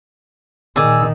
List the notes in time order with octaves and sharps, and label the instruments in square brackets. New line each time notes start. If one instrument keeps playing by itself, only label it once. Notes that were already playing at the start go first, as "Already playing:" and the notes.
[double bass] A#2 D#3 [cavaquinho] G#4 D5 G#5 [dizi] E6